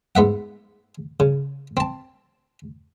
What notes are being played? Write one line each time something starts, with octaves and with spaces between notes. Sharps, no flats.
G#2 B3 E5 F#5
C#3
C4 A5